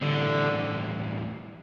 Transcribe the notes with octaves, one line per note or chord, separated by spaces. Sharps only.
A2 D3 E3 G3 C4